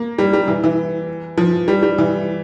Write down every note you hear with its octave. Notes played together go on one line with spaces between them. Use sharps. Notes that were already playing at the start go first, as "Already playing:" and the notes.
Already playing: A#3
G3
G3
E3
E3
F3
G3
G3
E3